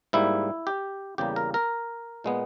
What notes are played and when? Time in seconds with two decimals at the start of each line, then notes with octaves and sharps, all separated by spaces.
0.13 G#2 G3 A#3 E4
0.67 G4
1.18 E2 C#3 G3 A#3 G4
1.36 A#4
1.54 A#4
2.24 A#2 G#3 B3